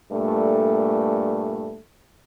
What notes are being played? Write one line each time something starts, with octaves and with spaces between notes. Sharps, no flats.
G2 A#2 A3